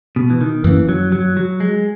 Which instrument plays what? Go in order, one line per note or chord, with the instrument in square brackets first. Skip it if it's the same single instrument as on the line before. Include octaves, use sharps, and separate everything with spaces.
[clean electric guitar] B2
E3
D#3
[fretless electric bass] F#2 D#3 A#3 C#4 [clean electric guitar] E3
[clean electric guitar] F#3
F#3
F#3
G#3